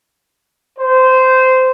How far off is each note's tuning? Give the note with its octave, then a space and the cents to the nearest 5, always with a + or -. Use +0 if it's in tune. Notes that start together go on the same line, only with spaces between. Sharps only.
C5 -15